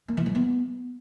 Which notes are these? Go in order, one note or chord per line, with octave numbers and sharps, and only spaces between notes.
A#3
E3
F#3
B3